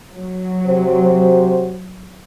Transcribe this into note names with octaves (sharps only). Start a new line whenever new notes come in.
F#3
C3 F#4 C5